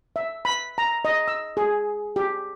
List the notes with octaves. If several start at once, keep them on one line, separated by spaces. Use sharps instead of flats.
E5
B5
A#5
D#5
E6
G#4
G4